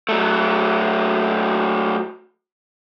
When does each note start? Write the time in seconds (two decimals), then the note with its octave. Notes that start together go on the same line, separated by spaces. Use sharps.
0.09 F#3 A3